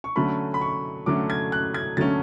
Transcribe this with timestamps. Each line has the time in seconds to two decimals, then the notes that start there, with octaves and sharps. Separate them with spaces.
0.04 C#6
0.16 D3 F#3 A3 C#4 B5
0.54 B5
0.61 C#6
1.06 D3 F#3 A3 C#4 D6
1.30 G#6
1.52 F#6
1.74 G#6
1.97 D3 F#3 A3 C#4 A6